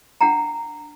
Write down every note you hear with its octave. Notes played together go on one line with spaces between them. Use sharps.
D4 F#5 G5 A#5